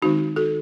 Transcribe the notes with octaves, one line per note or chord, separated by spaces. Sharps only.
D#3 G#3 C4 D#4 F#4
F#4 A4